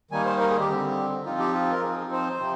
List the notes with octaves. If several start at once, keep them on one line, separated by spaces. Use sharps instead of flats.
D#3 G3 A#3 D#4 G#5
C5
A#4
G#4
G4
D3 G3 C4
F3 C4 D#4 F4
G4
F4
A#4
F3 C4 D#4 G#4
C5
C3 F3 C4